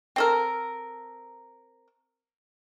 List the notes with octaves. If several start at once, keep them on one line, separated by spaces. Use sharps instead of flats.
C4 A4 A#4